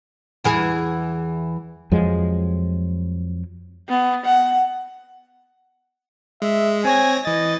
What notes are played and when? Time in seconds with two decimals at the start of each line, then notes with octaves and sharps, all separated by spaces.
0.44 E2 E3 G#4
1.92 F2 F3 F#3 G#3
3.89 B3
4.25 F#5
6.42 G#3 E5
6.85 C4 C#5 G#5 A#6
7.25 E3 D#5 A6